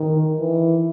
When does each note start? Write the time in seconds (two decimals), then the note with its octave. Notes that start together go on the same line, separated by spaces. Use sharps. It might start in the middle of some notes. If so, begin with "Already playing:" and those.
Already playing: D#3
0.39 E3